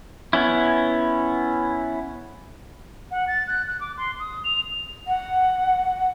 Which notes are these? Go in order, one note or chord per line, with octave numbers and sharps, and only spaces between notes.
B3 C#4 E4
F#5
A6
F#6
F#6
D6
C6
D#6
F7
F#5